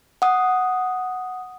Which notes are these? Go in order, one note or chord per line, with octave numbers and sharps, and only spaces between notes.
F#5 D#6